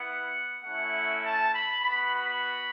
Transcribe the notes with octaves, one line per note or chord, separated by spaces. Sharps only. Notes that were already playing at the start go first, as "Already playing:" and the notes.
Already playing: B3 E4 F#5
A3 C#4 E4 F#5
A5
B5
B3 F#4 B5
B5